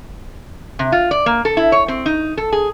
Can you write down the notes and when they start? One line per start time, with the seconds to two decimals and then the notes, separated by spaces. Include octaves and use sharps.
0.79 C3
0.92 F4
1.11 D5
1.26 A#3
1.45 A4
1.57 E4
1.72 C#5
1.88 C4
2.06 D#4
2.37 A4
2.52 G#4